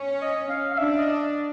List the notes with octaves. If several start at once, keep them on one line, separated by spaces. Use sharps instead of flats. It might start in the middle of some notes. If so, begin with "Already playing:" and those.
Already playing: C#4
D#5
F5
F5
D4 E5
D#5